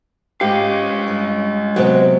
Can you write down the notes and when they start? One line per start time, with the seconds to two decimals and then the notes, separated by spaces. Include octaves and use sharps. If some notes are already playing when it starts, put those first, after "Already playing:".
0.41 G#2 G#3 G4 F5
1.07 G2 C#5
1.76 C3 F#3 B3 G4 G5